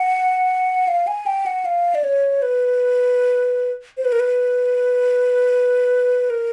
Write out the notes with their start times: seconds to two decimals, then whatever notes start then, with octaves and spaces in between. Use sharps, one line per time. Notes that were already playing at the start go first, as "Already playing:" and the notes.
Already playing: F#5
0.88 F5
1.07 G#5
1.26 G5
1.46 F#5
1.65 F5
1.95 D5
2.04 C#5
2.42 B4
3.97 C5
4.05 B4
4.12 A#4
4.20 B4
6.30 A#4